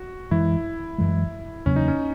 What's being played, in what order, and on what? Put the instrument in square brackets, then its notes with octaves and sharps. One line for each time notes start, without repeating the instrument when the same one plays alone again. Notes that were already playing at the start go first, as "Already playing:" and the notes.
Already playing: [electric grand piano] F#4
[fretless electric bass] F#2 E3 G#3 [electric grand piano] E4
[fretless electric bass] F#2 E3 G#3
[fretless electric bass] E2 C#3 F#3 A#3 [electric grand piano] C#4
[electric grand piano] D#4
C#4